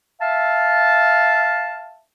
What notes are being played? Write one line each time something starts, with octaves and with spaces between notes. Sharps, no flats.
E5 F5 A5